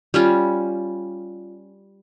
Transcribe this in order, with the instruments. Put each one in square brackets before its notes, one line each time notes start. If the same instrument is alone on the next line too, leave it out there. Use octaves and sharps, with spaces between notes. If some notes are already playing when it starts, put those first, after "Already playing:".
[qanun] G3 C#4 F4